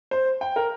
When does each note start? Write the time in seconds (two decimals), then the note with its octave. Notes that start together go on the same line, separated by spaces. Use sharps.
0.11 C5
0.41 G5
0.56 A#4